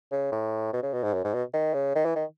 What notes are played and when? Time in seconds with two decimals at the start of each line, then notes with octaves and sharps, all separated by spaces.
0.12 C#3
0.32 A2
0.73 B2
0.83 C#3
0.94 B2
1.03 G#2
1.14 F#2
1.24 G#2
1.34 B2
1.54 D#3
1.74 C#3
1.95 D#3
2.05 E3
2.16 D#3